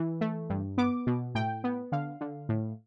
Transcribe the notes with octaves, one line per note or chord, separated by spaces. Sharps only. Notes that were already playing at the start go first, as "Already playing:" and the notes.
Already playing: E3
A3
G2
B3 D6
B2
A2 G5
B3
D3 F5
D3
A2